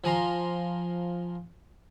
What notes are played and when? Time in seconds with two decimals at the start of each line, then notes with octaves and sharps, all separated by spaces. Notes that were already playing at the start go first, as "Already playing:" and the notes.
0.04 F3 G#5 A#5 C6